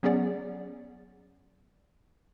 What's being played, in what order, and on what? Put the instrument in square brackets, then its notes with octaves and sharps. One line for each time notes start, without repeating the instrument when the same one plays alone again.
[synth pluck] F#3 B3 C#4 G#4 D5 F#5